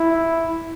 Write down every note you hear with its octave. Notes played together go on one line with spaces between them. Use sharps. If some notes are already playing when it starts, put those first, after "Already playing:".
Already playing: E4